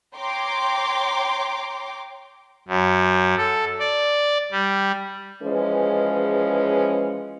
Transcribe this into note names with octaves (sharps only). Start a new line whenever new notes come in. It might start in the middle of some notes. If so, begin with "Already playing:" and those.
C#5 G5 A#5 C6 D6
F#2
A4
D5
G3
E3 F3 G#3 C#4 G#4 B4